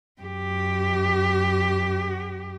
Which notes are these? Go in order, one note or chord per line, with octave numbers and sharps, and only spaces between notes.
F#2 G4